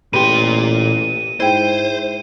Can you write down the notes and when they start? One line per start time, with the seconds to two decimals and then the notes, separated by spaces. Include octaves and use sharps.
0.13 A1 A#2 G4 B4 C6 D#7
1.40 G#2 E4 C5 G5 D#7